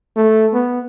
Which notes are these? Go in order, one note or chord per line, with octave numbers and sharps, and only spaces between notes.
A3
B3